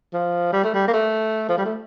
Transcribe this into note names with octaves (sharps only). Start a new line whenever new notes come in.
F3
G3
A3
G3
A#3
A3
F3
G3
A3